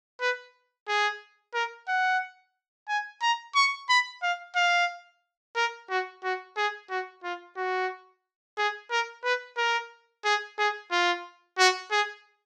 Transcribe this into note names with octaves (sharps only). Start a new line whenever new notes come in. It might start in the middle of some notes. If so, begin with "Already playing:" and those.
B4
G#4
A#4
F#5
G#5
A#5
C#6
B5
F5
F5
A#4
F#4
F#4
G#4
F#4
F4
F#4
G#4
A#4
B4
A#4
G#4
G#4
F4
F#4
G#4